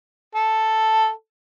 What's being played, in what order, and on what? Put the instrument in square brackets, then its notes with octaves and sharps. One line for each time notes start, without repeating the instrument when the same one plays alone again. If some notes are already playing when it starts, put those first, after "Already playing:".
[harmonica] A4